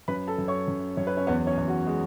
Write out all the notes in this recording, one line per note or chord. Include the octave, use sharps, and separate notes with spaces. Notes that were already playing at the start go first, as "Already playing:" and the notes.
F#2 B4 B5
A4 A5
F#2
C#5 C#6
F#2
F#2 C#5
B4
C#4 C#5
E2 B3 B4
C#4 C#5
E2
F#4
G#3